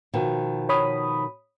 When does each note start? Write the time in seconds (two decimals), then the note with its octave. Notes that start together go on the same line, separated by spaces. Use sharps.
0.14 B2 D#3 F3
0.69 C#5 B5 D#6